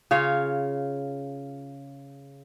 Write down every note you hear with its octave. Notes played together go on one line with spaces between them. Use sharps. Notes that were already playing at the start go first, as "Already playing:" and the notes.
C#3 F4 C#5 F5